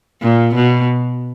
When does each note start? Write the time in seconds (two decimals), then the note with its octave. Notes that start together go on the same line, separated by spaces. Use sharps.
0.22 A#2
0.55 B2